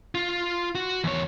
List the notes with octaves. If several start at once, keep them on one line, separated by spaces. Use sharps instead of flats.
F4
F#4
E2 C#5